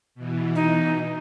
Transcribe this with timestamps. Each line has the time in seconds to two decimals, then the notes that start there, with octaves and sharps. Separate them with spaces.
0.15 B2 E3
0.55 D#4